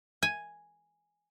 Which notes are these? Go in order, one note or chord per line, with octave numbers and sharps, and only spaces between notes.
G#5